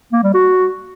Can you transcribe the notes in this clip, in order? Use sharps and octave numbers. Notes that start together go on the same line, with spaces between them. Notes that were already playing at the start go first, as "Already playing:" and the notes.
A#3
G3
F#4